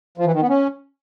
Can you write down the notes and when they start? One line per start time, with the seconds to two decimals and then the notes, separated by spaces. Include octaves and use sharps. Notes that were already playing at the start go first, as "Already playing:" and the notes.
0.18 F3
0.26 E3
0.33 D#3
0.41 B3
0.49 C#4